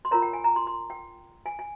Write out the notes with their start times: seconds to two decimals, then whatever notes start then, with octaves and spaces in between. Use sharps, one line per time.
0.05 C6
0.11 F4 A#4 C#5 A#5
0.22 G5
0.33 G#5
0.44 A#5
0.56 C6
0.67 C6
0.90 G5
1.46 G#5
1.59 G#5